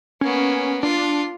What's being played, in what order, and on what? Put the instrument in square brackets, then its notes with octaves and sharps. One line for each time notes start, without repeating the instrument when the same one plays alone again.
[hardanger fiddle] A#3 B3 [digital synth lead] C#4
[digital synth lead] D4 [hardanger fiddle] F4